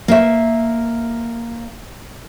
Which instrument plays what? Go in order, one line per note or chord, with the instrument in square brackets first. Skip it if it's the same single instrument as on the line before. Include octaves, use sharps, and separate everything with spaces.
[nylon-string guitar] A#3 E5